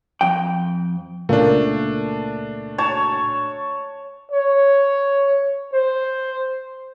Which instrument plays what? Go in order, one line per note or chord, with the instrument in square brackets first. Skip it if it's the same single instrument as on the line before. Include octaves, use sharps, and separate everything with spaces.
[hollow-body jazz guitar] F2 G5
[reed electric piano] C#2 A#2 A#3 [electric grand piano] A3 D4
[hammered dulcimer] C#5 A5
[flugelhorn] C#5
C5